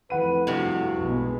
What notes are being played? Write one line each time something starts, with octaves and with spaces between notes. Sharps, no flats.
F2 E3 A3 B4 F#5 D#7
G2 C3 F#4
B1 G#3 B3